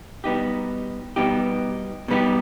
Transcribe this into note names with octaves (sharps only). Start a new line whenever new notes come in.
B2 G3 B3 D#4 G4
B2 G3 B3 D#4 G4
B2 G3 B3 D#4 G4